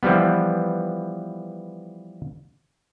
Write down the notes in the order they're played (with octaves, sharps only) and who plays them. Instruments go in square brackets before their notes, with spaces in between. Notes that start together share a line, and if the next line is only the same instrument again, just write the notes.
[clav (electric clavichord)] E3 F3 G3 B3